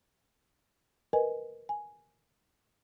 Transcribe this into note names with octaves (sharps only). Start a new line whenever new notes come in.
A#4 B4 D#5 G#5
G#5